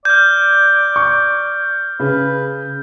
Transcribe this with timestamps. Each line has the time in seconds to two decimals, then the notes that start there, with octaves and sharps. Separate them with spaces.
0.05 D5 F6 G6
0.96 C#6
2.00 C#3 B4